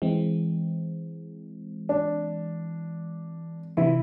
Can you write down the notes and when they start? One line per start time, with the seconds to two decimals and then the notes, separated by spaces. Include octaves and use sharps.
0.02 E3 G#3 C4
1.89 D4
3.77 C3 E3 E4